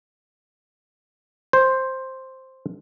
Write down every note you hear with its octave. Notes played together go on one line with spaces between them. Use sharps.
C5